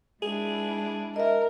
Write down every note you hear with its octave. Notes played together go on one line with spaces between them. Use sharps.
G#3 D4 E4 G#4
A#4 D#5 E5